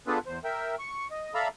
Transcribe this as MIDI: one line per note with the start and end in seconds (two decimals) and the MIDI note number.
0.07 0.19 59
0.07 0.19 62
0.07 0.19 65
0.07 0.19 68
0.07 0.19 69
0.07 0.19 71
0.26 0.39 40
0.26 0.39 72
0.44 0.75 70
0.44 0.75 76
0.44 0.75 79
0.79 1.07 85
1.11 1.34 75
1.34 1.48 69
1.34 1.48 74
1.34 1.48 76
1.34 1.48 77
1.34 1.48 82
1.34 1.48 83